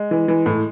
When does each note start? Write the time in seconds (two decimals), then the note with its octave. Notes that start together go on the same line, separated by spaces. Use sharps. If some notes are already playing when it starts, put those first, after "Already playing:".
Already playing: G#3
0.11 E3
0.28 E3
0.46 A2